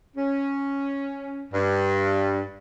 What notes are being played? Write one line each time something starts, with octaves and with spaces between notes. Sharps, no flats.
C#4
G2